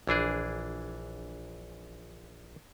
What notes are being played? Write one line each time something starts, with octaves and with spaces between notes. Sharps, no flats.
A#1 E3 D4 G#4